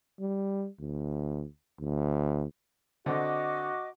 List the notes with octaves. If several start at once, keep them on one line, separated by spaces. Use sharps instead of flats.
G3
D2
D2
D3 C4 F#4 D#5 D6